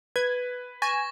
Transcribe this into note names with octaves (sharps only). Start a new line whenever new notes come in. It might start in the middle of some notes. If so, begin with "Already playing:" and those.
B4 G#6
G#5 C#6 A6 A#6